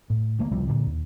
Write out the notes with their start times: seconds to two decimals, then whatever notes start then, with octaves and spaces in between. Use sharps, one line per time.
0.10 A2
0.39 D2 A3 A#3
0.51 C#2 C3 F3 G3
0.67 A#2 D3
0.87 D#2